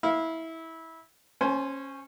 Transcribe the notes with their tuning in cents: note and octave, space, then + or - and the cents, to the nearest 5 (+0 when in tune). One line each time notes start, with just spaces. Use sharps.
E4 -20 F5 -10
C#4 -15 C5 +0 G#5 +40